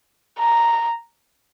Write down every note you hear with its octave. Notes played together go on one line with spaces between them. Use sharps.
A#5